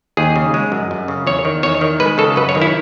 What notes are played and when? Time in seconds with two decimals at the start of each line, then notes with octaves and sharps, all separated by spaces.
0.17 D#2 G#4
0.36 C#3
0.54 G#3
0.72 F#2
0.91 F#2
1.08 C#3
1.27 E2 C#5
1.45 D#3
1.63 E2 C#5
1.81 D#3
2.00 G#3 B4
2.18 C#3 A4
2.36 F#2 B4
2.49 C#5
2.55 D#3
2.62 E4